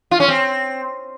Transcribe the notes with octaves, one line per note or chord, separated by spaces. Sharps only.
F4
C#4
C4